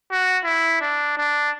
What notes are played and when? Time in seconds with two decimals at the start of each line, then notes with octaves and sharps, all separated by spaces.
0.12 F#4
0.45 E4
0.81 D4
1.17 D4